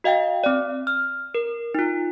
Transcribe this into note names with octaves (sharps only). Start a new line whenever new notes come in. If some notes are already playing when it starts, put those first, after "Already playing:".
F#4 D#5 F5 G5
C4 D5
F6
A#4
D#4 F4